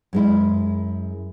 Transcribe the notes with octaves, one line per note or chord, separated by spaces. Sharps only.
F#2 G#3 E4